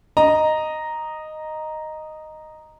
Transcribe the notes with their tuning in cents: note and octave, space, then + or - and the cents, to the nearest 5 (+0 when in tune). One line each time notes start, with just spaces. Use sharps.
D#5 -5 A#5 +0